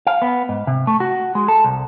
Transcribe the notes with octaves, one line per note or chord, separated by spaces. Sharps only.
F5
B3
G#2
C3
A3
F#4
G#3
A4
C2